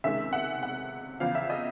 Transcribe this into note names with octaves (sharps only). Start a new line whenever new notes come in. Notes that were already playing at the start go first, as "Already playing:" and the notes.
C#2 C3 D#3 G#3 C#4 E5
F#5
F#5
E2 C#3 F3 F5
E5
D#5